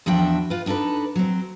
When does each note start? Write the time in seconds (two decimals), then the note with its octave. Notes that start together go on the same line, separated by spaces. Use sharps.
0.06 E2 F3 D4 F#4 E5 G5
0.50 F4 B4
0.66 B3 D4 D#4 A4 B4
1.15 F#3 C4